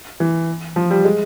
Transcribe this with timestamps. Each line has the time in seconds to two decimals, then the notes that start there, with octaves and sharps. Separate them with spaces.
0.20 E3
0.76 F3
0.91 G3
1.05 G#3